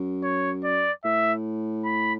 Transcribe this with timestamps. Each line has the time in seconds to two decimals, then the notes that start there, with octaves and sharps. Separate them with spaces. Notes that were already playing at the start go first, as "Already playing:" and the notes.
Already playing: F#2
0.23 C#5
0.64 D5
1.04 A2 E5
1.85 B5